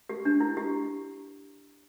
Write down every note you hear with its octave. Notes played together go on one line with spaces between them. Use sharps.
G4
D4
E4
G4